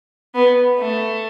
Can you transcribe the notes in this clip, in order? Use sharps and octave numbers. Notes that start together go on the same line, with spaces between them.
B3
A3